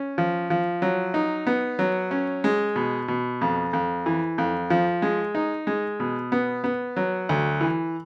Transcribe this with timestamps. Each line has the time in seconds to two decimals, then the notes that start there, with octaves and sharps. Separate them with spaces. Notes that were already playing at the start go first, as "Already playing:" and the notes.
Already playing: C#4
0.18 F3
0.50 F3
0.82 F#3
1.14 D#4
1.47 B3
1.79 F#3
2.11 C#4
2.44 G#3
2.76 B2
3.08 B2
3.41 F2
3.73 F2
4.06 E3
4.38 F2
4.70 F3
5.02 G#3
5.35 D#4
5.67 G#3
6.00 B2
6.32 B3
6.64 B3
6.96 F#3
7.29 D2
7.61 E3